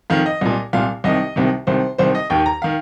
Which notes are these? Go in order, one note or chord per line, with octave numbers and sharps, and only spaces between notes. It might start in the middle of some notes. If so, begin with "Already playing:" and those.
F2 D#3 F5
D#5
C2 A#2
C2 A#2 F5
C2 C3 D#3 D#5
C2 C3 D#3
C2 C3 D#3 C5
C2 C3 D#3 C5
D#5
D#2 D#3 G5
A#5
D#3 F5